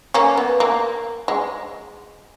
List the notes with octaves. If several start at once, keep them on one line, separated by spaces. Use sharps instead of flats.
A#3 C#4
B3
A#3
G#3